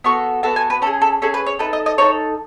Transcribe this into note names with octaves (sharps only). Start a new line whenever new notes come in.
B3 F#4 A4 C#6
B3 F#4 A4 A5
G#5
B4
C#4 A4
G#4
A4
C#4 G#4 A4
B4
C#5
D#4 A4 B4
D#5
D#5
D#4 A4 C#5